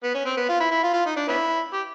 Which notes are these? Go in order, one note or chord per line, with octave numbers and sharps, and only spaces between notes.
B3
C#4
C4
B3
F4
E4
E4
F4
F4
D#4
D4
B3 C#4 E4
G4